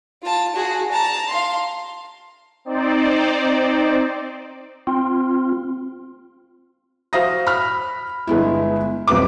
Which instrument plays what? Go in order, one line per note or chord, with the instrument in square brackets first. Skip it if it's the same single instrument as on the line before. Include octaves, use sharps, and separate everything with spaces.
[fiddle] F4 A5
F#4 G#4
A5 A#5
F5 C6
[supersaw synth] C4 D#4 C5 D5
[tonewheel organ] C4 F4
[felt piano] F#4 C5 F5 D#6 A#6
B5 F6
G1 G#3 B3 E4
D#1 B1 C4 B4 D6